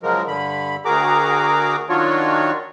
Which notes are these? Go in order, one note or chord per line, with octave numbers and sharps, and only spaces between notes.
C#3 F3 F#3 G#3 A#4
G2 D3 B5
D2 F#4 G#4 A#4 A#5 D6
D#3 F#3 D4 F4 F#4 C#5